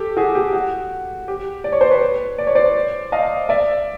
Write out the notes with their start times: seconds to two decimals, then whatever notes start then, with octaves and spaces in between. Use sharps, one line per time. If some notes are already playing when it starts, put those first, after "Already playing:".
Already playing: G4 A4
0.17 F#4 G#4
0.35 G4
0.53 F#4
1.28 G4
1.64 D5
1.72 C#5
1.81 C5
1.90 B4 C#5
2.38 D5
2.47 C#5
2.55 C5 D5
3.12 D#5 F5
3.49 D5 E5